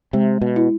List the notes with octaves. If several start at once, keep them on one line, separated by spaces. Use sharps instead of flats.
C3 G#3
B2
E4